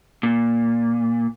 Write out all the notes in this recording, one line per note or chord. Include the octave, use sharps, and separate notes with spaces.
A#2